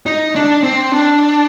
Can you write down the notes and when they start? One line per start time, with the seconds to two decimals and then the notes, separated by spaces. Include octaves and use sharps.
0.06 D#4
0.35 D4
0.63 C4
0.92 D4